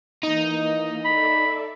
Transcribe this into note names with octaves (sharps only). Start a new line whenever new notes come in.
E3 A#3 D#4
A4 D5 E5 B5